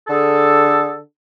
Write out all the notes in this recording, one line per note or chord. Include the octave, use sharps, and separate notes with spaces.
D3 G#4 A4